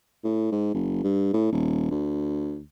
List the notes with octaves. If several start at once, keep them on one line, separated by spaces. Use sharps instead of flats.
A2
G#2
F#1
G2
A2
D#1
D2